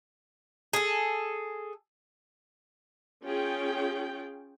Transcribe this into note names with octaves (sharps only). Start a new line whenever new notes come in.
G#4 A4
C#4 F4 G#4 G5